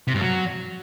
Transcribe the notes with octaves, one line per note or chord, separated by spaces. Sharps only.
C3
G2
F#3